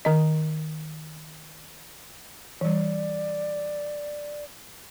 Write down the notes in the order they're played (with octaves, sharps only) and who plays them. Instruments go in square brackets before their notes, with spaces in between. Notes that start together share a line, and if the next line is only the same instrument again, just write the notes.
[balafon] D#3 D#5
[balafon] E3 G3 [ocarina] D5